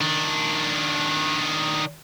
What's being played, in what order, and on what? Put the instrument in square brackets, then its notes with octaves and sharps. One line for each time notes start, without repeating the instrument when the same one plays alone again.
[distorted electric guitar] D#3 D4